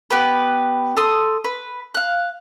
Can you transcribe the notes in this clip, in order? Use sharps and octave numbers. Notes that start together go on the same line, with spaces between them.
B3 G4 B4
A4 C6 D#6
B4
F5 F#6